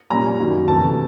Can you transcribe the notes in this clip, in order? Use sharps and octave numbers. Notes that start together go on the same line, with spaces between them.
A#2 G3 A#3 C#4 A#5
F#2 D#3 F#3 A#3
D2 C3 E3 A3 A5